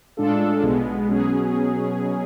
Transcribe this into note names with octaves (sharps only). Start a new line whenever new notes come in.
A2 G#3 D4 F4 A4
B1 B2 G#3 B3
B2 F#3 C#4 G#4